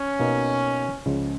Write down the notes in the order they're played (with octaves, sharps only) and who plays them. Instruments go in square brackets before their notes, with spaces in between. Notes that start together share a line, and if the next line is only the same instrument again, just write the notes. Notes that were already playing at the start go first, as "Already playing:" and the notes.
Already playing: [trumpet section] C#4
[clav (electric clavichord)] B2 A#3 D#4 A#4
C#2 C#3 F3 G#3